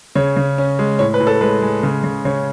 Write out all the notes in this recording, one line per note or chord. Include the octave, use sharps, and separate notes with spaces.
C#3 C#5
C#3
C#4
G#3
A2 C#5
B4
A2
A4
G#3 B4
G#3
C#3
C#3
C#3 C#5